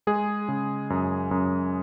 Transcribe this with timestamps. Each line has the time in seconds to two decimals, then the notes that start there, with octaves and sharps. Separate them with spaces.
0.07 G#3 G#4
0.48 C#3
0.90 F#2
1.31 F#2